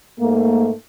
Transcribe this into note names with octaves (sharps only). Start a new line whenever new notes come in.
G#2 A3 A#3